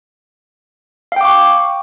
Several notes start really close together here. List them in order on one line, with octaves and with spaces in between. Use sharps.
F5 G5 D6 C#6